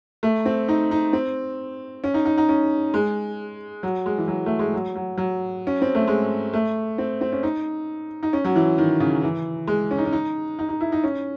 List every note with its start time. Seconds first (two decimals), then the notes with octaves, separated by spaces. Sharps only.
0.23 A3
0.46 C4
0.68 D#4
0.91 D#4
1.13 C4
2.04 C#4
2.14 D#4
2.25 D#4
2.38 D#4
2.49 C#4
2.94 G#3
3.83 F#3
4.06 G#3
4.18 E3
4.28 F#3
4.46 A3
4.59 G#3
4.74 F#3
4.95 F#3
5.18 F#3
5.67 C#4
5.82 C4
5.95 A3
6.08 G#3
6.54 A3
6.98 C4
7.21 C4
7.32 C#4
7.43 D#4
8.23 D#4
8.33 C#4
8.44 F#3
8.56 E3
8.78 D#3
9.00 C#3
9.23 E3
9.67 G#3
9.91 C#4
9.98 D#4
10.05 C#4
10.13 D#4
10.59 D#4
10.69 D#4
10.81 E4
10.92 D#4
11.04 C#4